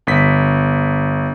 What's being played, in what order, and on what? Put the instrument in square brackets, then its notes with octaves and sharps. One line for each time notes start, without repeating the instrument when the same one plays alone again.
[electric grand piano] G1 B6